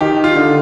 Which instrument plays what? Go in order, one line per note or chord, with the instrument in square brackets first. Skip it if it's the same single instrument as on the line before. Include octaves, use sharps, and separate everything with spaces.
[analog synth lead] D#3 [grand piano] G4
[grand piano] F4
[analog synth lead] D3